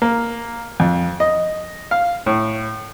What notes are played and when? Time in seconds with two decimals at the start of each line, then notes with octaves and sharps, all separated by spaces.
0.02 A#3
0.80 F2
1.20 D#5
1.91 F5
2.26 A2